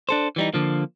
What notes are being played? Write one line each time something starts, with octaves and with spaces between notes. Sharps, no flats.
D4 A4 C5
E3 G3 D#4
D3 F3 A#3